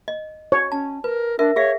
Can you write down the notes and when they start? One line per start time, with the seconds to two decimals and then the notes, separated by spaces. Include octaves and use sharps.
0.08 D#5
0.52 C#5
0.72 C#4 A5
1.04 A#4 B4
1.39 D4 A#4 E5
1.56 G#4 C#5 E5 F5